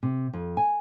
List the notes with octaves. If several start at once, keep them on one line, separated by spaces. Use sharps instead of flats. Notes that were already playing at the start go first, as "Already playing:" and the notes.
C3
F2
G#5